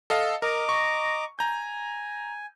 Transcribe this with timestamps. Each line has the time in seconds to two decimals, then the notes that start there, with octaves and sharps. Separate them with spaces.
0.10 A4 D#5 F5
0.42 A#4 D#5 A#5 D6
0.69 C#6
1.39 G#5 A#5 G6